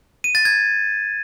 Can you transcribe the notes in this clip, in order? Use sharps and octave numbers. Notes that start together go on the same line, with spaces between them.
D#7
A6
G#6